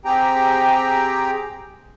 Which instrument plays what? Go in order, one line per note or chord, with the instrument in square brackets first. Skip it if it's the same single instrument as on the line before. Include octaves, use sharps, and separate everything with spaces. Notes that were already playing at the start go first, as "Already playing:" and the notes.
[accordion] C4 G4 G#4 G5 A#5